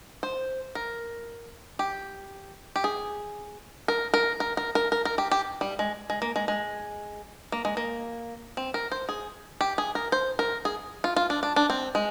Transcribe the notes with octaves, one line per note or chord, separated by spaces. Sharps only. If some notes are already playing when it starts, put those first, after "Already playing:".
C5
A#4
G4
G4
G#4
A#4
A#4
A#4
A#4
A#4
A#4
A#4
G4
G4
G3
G#3
G#3
A#3
G#3
G#3
A#3
G#3
A#3
C4
A#4
C5
G#4
G4
G#4
A#4
C5
A#4
G#4
F4
F4
D4
D4
D4
C4
G#3